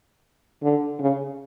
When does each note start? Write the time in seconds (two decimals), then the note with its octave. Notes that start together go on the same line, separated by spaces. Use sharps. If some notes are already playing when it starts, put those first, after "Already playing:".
0.63 D3
1.00 C#3